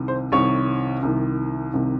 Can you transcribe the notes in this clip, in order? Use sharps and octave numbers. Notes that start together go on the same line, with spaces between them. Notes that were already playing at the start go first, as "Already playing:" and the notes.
Already playing: C2 C3 D#3
C5
C2 C3 D#3 C#5
C2 C3 D#3
C2 C3 D#3